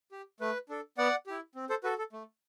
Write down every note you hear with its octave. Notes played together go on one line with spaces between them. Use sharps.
G4
A3 B4
D4 A4
B3 D5 F#5
E4 G4
C4
A4 C5
F#4 A4 B4
A4
A3